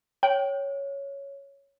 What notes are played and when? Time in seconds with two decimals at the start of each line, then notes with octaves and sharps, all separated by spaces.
0.23 C#5 G5